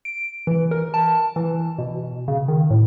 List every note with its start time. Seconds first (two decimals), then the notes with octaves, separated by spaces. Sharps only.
0.05 D7
0.47 E3
0.71 A#4
0.94 A5
1.36 E3
1.78 B2
2.28 C#3
2.48 D#3
2.70 A2